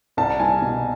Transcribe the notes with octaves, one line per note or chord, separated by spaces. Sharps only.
C2 A5
G3 G#5
B2